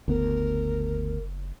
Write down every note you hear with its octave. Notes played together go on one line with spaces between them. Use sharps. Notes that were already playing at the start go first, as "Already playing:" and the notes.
F#1 D2 B3 A#4